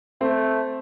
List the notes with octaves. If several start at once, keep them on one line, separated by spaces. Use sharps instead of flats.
A3 C4